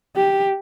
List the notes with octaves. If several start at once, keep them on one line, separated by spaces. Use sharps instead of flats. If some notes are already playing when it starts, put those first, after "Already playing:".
G4